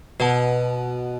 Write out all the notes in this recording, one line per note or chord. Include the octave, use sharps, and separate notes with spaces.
B2 F#4 B4 F#5 A5